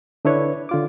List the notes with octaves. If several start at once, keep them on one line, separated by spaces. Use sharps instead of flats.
D3 D4 E4 B4 C#5
D3 F4 D6